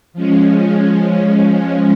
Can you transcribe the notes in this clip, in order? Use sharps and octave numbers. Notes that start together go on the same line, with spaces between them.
F3 G#3 C#4